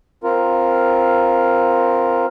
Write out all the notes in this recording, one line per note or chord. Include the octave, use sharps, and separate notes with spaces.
C4 F4 A#4